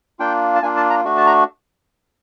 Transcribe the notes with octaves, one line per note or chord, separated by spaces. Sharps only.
A#3 D4 F4 G5
A5
A#3 D4 F4 G#5
A5
A#5
A3 D4 F#4
A5
A#5